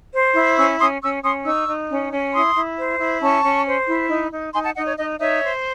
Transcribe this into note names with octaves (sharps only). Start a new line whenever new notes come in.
C5
E4
C#4 C#6 E6
C#4 C6 D#6
C#4 C#6 E6
C#4 C6 D#6
D#4 C#6 E6
D#4
C#4
C#4
E4 C6 D#6
E4
C5
E4
C#4 A5 C#6
C#4
C5
E4
D#4
D#4
D#4 G#5 C6
F#5 A5
D#4 D#5 F#5
C#5
D#4 D#5
D#4 C#5 E5
C5